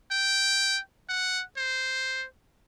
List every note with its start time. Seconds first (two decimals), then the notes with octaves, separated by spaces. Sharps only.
0.12 G5
1.09 F#5
1.57 C5